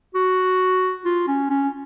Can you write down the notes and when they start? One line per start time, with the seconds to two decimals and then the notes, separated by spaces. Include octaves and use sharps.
0.15 F#4
1.05 F4
1.28 C#4
1.50 C#4